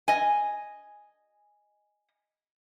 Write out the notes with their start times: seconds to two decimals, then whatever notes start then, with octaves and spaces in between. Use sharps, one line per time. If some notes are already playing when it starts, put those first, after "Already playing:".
0.08 D#5 G#5